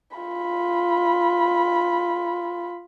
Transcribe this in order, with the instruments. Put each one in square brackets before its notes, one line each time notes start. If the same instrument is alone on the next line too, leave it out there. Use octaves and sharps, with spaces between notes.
[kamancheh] F4 B5